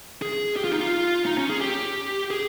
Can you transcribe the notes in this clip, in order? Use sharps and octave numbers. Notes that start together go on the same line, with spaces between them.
G#4
G4
F4
D#4
F4
D#4
C#4
G#4
G4
G#4